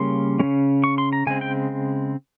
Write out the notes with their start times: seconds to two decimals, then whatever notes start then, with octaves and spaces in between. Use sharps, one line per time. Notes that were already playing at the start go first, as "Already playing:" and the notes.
Already playing: C#3 G3 A#3 C#4 C6
0.39 G#3 C#4
0.43 C#3
0.84 C#6
0.98 C6
1.13 A#5
1.27 C#3 G#3 C4 G#5
1.41 G5